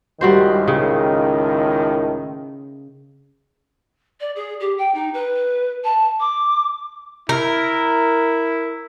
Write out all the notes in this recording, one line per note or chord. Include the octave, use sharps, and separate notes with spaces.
C#2 A2 D#3 G3 F#4 C5
C#3
D5
G#4
G4
G5
D#4
B4
A5
D6
E4 A#4